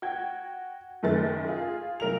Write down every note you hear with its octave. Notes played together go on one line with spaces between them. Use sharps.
F#4 G5 G#6
F#1 F#2 D#3 A3 A6
F4 G#4
B1 A#4 F7